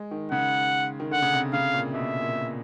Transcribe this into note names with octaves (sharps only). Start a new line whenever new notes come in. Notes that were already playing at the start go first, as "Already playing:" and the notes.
Already playing: G#3
D#3
C#3 F#5
D#3
D3 F#5
C#3
C3
C#3 F5
A#2
B2 E5
A#2